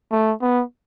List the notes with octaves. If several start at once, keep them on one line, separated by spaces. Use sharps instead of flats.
A3
B3